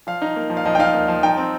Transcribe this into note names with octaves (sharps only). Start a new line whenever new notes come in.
F3 F5
D#4
A#3
F3
F5
F3 D#5
G5
D#4 F5
A#3
F3
D#4 G5
C4